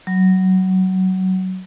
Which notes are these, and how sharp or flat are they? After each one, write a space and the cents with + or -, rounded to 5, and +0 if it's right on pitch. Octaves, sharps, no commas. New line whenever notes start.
F#3 +20